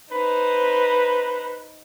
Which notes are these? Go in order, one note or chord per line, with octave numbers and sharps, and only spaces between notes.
D#4 B4 C5